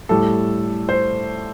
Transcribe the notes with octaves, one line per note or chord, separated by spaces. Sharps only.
A2 G3 A4
C5